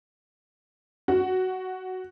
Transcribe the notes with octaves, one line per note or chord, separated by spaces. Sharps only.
F#4